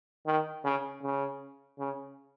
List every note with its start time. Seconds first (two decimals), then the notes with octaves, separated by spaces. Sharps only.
0.27 D#3
0.64 C#3
1.03 C#3
1.79 C#3